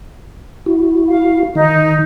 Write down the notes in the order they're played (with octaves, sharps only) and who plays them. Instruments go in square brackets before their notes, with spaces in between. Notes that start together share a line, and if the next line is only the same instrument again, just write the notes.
[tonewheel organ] E4 F#4
[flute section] F5
[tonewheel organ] D#3 [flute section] D#4